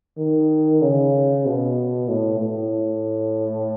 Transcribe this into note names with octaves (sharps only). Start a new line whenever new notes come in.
D#3
C#3
B2
A2
A2